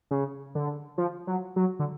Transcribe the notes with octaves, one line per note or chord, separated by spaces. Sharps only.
C#3
D3
F3
F#3
F#3
D3